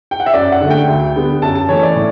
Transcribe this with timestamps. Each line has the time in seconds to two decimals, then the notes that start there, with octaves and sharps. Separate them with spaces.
0.11 G5
0.20 F#5
0.26 E5
0.33 F#2 D5
0.52 F#5
0.61 D3
0.66 A3 G5
0.87 D2
1.16 D3 G3 B3
1.42 F#2 A5
1.55 A5
1.69 E3 A3 C#5
1.83 D5
1.96 A2